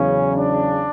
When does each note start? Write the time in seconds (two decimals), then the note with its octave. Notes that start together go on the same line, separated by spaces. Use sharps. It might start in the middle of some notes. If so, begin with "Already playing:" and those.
Already playing: E2 C#3 F#3 C#4
0.35 D4